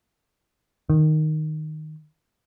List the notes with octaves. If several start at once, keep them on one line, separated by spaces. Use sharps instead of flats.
D#3